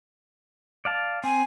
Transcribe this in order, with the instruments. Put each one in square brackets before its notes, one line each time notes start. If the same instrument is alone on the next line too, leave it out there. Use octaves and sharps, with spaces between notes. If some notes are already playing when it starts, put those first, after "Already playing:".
[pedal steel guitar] D5 F5 A5
[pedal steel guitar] C4 [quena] G#5